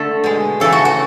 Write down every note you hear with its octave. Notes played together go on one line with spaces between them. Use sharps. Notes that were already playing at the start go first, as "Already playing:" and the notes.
Already playing: D3 A3 A4
B2 G#3
C#3 E3 A3 A4
F#4
F#4